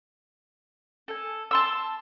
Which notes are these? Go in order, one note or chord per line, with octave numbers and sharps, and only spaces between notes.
A4 G#5
A5 C6 E6